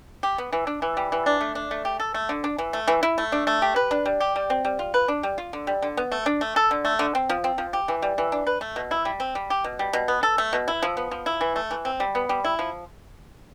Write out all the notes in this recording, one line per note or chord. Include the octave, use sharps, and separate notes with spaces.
G4
B3
E3
D4
E3
G3
E3
D4
A3
D4
A3
G4
A4
A3
D3
D4
E3
A3
E3
E4
A3
D4
A3
G4
B4
D4
G3
G4
G3
C4
G3
F4
B4
D4
G3
F4
D3
G3
D3
B3
A3
D4
A3
A4
D3
A3
D3
C4
F3
C4
F3
G4
E3
G3
E3
D4
B4
A3
B2
E4
G3
C4
G3
G4
B2
G3
B2
B3
A4
A3
B2
E4
F3
B3
F3
E4
E3
A3
E3
C4
G3
B3
G3
E4
F3